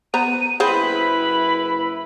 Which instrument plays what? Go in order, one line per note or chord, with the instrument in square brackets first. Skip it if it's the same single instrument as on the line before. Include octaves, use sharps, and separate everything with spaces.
[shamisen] B3 C5 A#5 [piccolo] D#7
[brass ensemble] F#1 E4 B4 [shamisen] C4 G#4 C5 [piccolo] B5